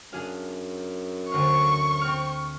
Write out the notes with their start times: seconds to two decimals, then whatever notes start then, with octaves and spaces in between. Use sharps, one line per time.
0.12 F#2 D4 G#4 F5
1.32 D2 C5 F5 C#6
2.01 C4 F6